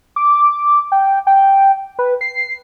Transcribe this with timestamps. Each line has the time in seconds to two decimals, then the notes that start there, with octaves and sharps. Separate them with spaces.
0.16 D6
0.92 G5
1.27 G5
1.99 B4
2.21 C7